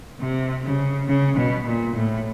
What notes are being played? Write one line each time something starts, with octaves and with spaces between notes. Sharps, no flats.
C3
C#3
C#3
B2
A#2
A2